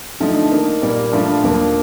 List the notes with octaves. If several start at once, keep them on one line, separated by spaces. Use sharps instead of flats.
D3 F3 A3 D#4
D#3 A#3 D#4
A#2 G3 A#3
G2 F3 A3 D4 F4
D#2 D3 F3 A#3